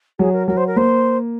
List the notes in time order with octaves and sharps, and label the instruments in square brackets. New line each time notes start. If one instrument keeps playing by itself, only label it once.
[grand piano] F#3 [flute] G#4
[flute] A#4
[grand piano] F#3 [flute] A#4
[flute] C5
A#4
[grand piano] A#3 [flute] C5